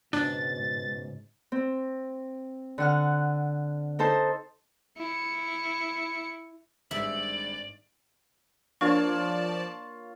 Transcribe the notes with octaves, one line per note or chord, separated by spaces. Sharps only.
C#2 G#2 B2 D4 A6
C4
D3 F#5 F6
D#4 A4 C5 A5
E4 C#7
G#1 G2 G#3 D5 E5 F#7
F3 A#3 D4 F4 C#5 D5 A5 C#6